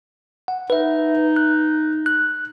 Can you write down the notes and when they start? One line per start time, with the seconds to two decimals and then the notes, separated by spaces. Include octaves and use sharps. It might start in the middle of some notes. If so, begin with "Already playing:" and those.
0.48 F#5
0.70 D#4 B4 E5
1.36 F#6
2.06 F#6